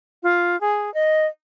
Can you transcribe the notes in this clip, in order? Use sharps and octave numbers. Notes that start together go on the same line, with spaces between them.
F4
G#4
D#5